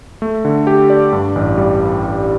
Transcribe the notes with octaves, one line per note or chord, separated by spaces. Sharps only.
A3
D3
G4
D5
G2
A1
G3